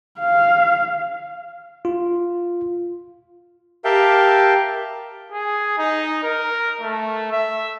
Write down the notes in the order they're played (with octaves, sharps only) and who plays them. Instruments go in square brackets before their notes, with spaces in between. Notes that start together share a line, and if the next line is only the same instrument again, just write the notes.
[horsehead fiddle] F5
[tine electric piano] F4
[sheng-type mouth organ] G4 A#4 E5 F5 G5 A5
[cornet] G#4
D#4
A#4
A3
E5